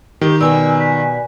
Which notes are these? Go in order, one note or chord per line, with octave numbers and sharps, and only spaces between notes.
D#3 G4
B2 F#4 D5 G#5 E6
B6